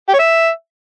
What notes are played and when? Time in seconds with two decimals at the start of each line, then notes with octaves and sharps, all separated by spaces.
0.08 G4
0.14 C#5
0.19 E5